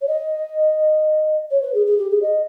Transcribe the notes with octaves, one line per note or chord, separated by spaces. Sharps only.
C#5
D#5
C#5
B4
G#4
G#4
G4
G#4
D#5